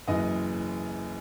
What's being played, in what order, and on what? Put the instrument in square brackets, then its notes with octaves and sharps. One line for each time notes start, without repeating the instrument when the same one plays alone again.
[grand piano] F#1 F#2 E3 D#5